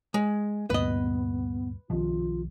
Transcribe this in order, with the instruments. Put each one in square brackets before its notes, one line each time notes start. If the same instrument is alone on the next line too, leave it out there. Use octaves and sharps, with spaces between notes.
[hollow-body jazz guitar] G#3
[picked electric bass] D2 G2 A#2 [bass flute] B3 [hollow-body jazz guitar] B4 D#5
[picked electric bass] B1 D#3 F3 [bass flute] F4